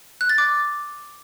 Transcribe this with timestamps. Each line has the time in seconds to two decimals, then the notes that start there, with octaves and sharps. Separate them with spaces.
0.21 F#6
0.29 A6
0.38 D6